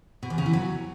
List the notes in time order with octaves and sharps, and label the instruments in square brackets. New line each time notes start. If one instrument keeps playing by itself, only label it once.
[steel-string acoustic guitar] B2
E2
C#3
E3
F#3